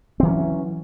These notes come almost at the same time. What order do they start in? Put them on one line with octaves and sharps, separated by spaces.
C4 E3 F#3 C#4